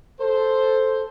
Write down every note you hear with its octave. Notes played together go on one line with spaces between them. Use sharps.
A4 C5